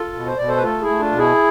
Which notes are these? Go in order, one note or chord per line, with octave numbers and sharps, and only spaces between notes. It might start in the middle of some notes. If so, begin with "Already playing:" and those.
Already playing: F4 A4
B2
C5
B2 D5
A4 C5
B4
A3 F4 A4
E4 G#4
A3
D4 F4
B2
E4 G#4